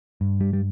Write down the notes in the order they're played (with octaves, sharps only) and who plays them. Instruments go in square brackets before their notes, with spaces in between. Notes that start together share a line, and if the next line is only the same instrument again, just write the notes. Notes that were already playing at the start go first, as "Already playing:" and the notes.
[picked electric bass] G2
G3
G3